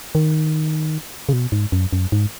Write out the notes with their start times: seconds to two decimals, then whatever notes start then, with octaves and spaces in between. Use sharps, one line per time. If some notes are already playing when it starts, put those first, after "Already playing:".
0.15 D#3
1.29 C#3
1.33 B2
1.52 G#2
1.72 F#2
1.93 F#2
2.12 G#2